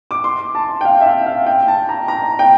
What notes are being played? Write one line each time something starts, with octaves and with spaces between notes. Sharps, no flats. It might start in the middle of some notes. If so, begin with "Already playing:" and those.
D6
C6
A5
G5
F5
E5
F5
F5
G5
A5
A#5
A#5
G5